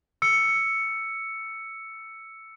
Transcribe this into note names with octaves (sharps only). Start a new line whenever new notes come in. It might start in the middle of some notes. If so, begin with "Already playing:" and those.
E6 C#7